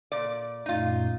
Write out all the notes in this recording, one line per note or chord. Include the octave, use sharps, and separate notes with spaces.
A#2 D5
F#2 A#2 A3 D#4 F4